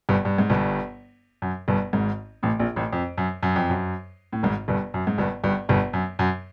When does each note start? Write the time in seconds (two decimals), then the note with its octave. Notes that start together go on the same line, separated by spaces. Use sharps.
0.09 G1 G2
0.25 G2
0.38 G#2
0.50 G1 G2
1.42 F#2
1.68 G1 G2
1.93 G#1 G#2
2.43 A1 A2
2.59 A#1 A#2
2.76 A1 A2
2.93 F2
3.18 F#2
3.43 F#2
3.56 F2
3.70 F#2
4.33 A2
4.43 G#1 G#2
4.68 G1 G2
4.94 F#2
5.07 G#2
5.18 G1 G2
5.44 G1 G2
5.69 G1 G2
5.93 F#2
6.19 F#2